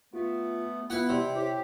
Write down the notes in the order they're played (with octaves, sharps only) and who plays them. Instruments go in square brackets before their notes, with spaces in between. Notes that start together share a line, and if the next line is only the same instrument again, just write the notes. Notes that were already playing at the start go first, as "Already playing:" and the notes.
[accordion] A3 B3 [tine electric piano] F4
[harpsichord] B3 B4 [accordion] E4 [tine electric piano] F4
[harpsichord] C3 [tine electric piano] D5 C6
[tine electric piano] E4 C5 C#5 [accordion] G4